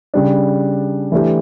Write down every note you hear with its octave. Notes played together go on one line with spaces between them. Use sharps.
C#3 G3 D4
E3 A3 D4 G4